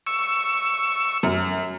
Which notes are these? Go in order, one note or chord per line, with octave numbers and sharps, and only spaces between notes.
C#6 E6
F#2